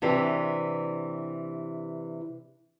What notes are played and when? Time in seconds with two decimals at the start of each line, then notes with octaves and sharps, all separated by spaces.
0.02 C3 E3 D4 G4